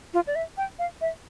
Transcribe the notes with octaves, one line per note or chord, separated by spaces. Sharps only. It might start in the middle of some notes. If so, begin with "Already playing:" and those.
F4
D5
E5
G5
F5
E5